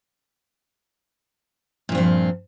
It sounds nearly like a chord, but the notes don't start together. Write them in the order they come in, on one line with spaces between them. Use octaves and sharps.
A#2 G2 C4 F3